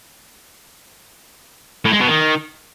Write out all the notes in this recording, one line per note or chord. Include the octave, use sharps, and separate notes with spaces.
A2
G#3
B2
D#3